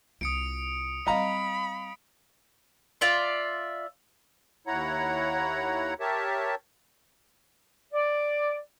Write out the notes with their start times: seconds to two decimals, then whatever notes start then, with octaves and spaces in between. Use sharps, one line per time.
0.21 C2 F4 D#6 C#7 D7
1.07 G3 C4 D#5 F5 A#5 B5
3.01 F4 D5 E5
4.67 D#2 E4 C#5 F#5 A#5
6.00 G4 A#4 C#5 E5 A5
7.93 D5